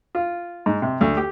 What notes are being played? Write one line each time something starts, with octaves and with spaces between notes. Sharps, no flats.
F4
G#2
C3
D2
G4